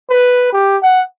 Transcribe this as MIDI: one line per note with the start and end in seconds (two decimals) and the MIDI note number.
0.10 0.49 71
0.53 0.77 67
0.83 1.04 78